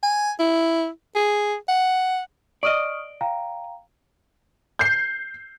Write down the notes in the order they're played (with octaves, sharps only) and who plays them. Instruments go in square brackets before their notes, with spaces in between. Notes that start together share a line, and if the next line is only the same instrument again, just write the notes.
[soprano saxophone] G#5
E4
G#4
F#5
[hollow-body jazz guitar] D5 D#5 [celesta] C#6 D#6 F6
[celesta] F5 G5 A#5
[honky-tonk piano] G6 C7